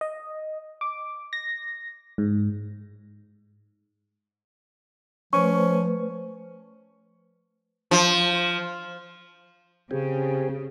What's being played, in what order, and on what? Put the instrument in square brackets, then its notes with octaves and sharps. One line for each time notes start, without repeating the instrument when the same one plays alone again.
[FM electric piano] D#5
D6
A#6
G#2
[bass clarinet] F3 [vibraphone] A3 B4 C5 [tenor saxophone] C#4 [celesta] C#6
[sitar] F3
[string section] C#3 [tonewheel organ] C4 G4 G#4